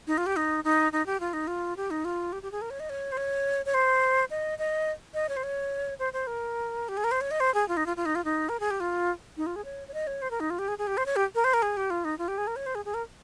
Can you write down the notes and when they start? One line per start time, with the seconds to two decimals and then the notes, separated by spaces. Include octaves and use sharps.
0.07 D#4
0.18 F4
0.26 G4
0.36 D#4
0.64 D#4
0.93 D#4
1.06 G4
1.20 F4
1.33 D#4
1.47 F4
1.77 G4
1.91 D#4
2.05 F4
2.33 G4
2.43 G4
2.52 G#4
2.62 A#4
2.70 C#5
2.80 D#5
2.90 C#5
3.12 C5
3.17 C#5
3.66 C#5
3.74 C5
4.30 D#5
4.59 D#5
5.14 D#5
5.29 C#5
5.37 C5
5.43 C#5
5.99 C5
6.13 C5
6.27 A#4
6.89 G4
6.97 G#4
7.04 A#4
7.11 C5
7.21 C#5
7.31 D#5
7.40 C5
7.54 G#4
7.69 F4
7.77 D#4
7.86 F4
7.97 F4
8.06 D#4
8.15 F4
8.25 D#4
8.49 A#4
8.60 G#4
8.71 G4
8.80 F4
9.37 D#4
9.46 F4
9.56 G#4
9.65 C#5
9.88 C#5
9.94 D#5
10.07 C#5
10.22 C5
10.31 A#4
10.40 D#4
10.50 F4
10.59 G4
10.68 G#4
10.78 G#4
10.87 G4
10.97 C5
11.06 C#5
11.16 G4
11.35 A#4
11.44 C5
11.54 A#4
11.62 G#4
11.77 G4
11.90 F4
12.05 D#4
12.18 F4
12.28 G4
12.38 G#4
12.47 A#4
12.56 C#5
12.66 C5
12.75 G#4
12.85 G#4
12.94 A#4